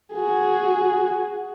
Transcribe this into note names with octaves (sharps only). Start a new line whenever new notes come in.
F#4 G#4